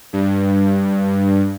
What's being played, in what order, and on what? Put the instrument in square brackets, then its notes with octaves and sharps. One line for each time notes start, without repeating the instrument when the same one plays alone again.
[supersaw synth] G2